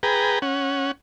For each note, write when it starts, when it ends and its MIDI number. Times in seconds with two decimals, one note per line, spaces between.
0.03 0.39 68
0.03 0.39 71
0.03 0.39 79
0.03 0.39 82
0.42 0.91 61
0.42 0.91 78